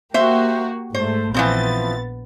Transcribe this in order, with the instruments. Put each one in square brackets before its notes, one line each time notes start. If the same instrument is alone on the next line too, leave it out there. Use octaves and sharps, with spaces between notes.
[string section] A#3 F#4 G4 [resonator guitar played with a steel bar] C5 E5
[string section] G#2 A3 [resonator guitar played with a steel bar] C5
[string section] A#1 B3 A6 [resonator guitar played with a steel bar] E3 F3 C4